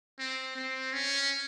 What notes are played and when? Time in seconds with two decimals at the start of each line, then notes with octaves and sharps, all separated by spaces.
0.19 C4
0.56 C4
0.93 C#4